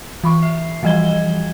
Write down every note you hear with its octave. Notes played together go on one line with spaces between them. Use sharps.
E3 B5 C#6
E5 C7
E3 F3 G3 D#5 G#6 G7